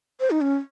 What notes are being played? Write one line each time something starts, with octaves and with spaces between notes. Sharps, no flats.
C5
D#4
C#4